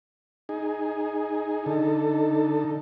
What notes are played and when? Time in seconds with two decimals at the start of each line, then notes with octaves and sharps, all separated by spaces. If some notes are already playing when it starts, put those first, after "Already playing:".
0.49 D#4 G#4
1.66 D3 D#4 A4